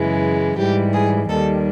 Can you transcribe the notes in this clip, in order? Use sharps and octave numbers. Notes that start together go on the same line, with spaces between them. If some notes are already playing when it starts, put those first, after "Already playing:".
Already playing: F#2 C#3 E3 G#3
G#2 E3 G3 G4
G#4
D#2 D#3 G3 A4